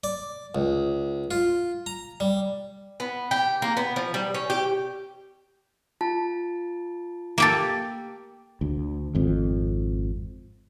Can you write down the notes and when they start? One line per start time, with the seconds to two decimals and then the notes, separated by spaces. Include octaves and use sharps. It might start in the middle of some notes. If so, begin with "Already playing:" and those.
0.04 D5
0.55 C#2
1.31 F4
1.86 A#5
2.20 G3
3.00 B3
3.31 G4
3.62 A#3
3.77 B3
3.96 F3
4.14 G3
4.34 C#4
4.50 G4
6.01 F4 A5
7.38 A#3 G4 A4
8.61 D2
9.15 G#1 F2